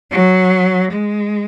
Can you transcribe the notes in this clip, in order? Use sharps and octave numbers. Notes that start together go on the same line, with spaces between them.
F#3
G#3